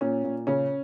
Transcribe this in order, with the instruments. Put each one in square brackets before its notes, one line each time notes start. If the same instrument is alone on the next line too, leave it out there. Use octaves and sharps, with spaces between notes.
[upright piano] A#2 C#4
A#2
C#3 C#4